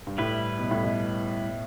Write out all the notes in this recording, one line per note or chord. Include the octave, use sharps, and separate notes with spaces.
G2
A2 G3 E4 B4
B2
A2
B2